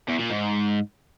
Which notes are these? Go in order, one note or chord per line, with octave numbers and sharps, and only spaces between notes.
E2
A#2
G#2